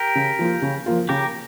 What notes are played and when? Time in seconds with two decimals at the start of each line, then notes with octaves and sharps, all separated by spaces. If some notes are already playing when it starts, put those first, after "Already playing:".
Already playing: G4 A#4
0.15 C#3
0.39 F3 A#3 F4
0.62 C#3
0.86 F3 A#3 F4
1.09 C#3 G4 A#4